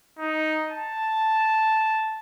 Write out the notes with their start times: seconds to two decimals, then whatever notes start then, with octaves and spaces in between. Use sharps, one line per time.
0.19 D#4
0.71 A5